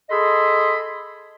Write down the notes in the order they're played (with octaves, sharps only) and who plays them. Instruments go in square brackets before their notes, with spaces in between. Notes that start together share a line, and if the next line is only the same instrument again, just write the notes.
[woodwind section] G#4 A4 D#5 B5 C6